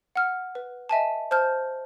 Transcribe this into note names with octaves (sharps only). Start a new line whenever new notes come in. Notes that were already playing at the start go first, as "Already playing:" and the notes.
F#5 F6
B4
D#5 E5 G#5 A5
C5 A5 F6 G6